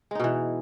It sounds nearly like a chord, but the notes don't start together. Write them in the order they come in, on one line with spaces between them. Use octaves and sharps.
G#3 D#4 B2 E3